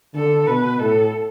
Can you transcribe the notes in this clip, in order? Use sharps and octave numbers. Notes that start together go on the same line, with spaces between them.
D3 A4
B2 B4
A2 A4